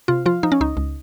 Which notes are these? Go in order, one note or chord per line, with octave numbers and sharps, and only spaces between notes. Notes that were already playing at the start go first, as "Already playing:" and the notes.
C3 F4
F3 F4
F3 D#4
C#4
C#2 D#4
C#2